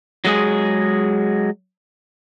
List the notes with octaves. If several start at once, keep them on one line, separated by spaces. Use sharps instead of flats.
F#3 G#3 G#4